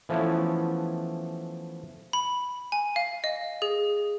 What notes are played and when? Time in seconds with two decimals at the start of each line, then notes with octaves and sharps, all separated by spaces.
0.09 E3 F3 A3 B3 C#4 E4
2.13 B5
2.72 G#5
2.96 F5
3.24 D#5
3.62 G#4